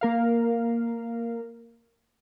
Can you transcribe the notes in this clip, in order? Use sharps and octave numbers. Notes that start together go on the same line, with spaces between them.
A#3 A#4 F5